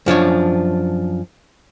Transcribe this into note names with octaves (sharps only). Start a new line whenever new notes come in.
F#2 F3 D4 C#5